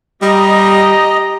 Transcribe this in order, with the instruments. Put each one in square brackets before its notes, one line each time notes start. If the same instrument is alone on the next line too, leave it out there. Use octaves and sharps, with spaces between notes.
[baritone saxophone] G3 [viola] G4 A#5 [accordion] D#5